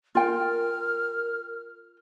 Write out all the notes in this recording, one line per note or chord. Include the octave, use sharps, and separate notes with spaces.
F4 A#4 G5 F6